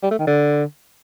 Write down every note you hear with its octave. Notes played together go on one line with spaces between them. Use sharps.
G3
A3
D#3
D3